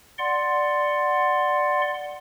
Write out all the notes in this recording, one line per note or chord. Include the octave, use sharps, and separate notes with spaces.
D5 F#5 C6